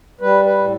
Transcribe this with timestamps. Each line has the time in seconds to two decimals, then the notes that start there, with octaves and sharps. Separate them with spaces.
0.21 G3 B4
0.45 B4
0.58 A2